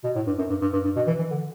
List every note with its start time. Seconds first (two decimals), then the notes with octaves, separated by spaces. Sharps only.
0.04 B2
0.15 A2
0.27 G2
0.38 F#2
0.49 G2
0.61 G2
0.73 G2
0.84 G2
0.96 B2
1.07 E3
1.19 E3
1.31 D3